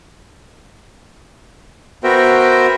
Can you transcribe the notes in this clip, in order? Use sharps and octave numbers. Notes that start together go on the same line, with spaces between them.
B3 F#4 A#4 C5 E5 G5